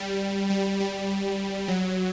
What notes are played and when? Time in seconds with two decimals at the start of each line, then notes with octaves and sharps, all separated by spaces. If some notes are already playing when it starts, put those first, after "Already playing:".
Already playing: G3
0.50 G3
0.80 G3
1.68 F#3